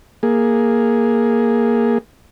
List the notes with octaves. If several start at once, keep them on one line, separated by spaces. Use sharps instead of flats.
A#3 G#4